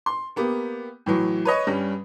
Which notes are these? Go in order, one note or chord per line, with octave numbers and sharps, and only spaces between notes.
C6
A#3 B3 G4
A2 E3 F#3
B4 C#5 D#5 C#6
G2 G3 C#4